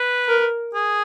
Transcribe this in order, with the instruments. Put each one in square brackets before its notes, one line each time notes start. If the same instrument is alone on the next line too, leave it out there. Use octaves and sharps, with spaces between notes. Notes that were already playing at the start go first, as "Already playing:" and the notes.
Already playing: [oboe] B4
[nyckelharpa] A#4
[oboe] G#4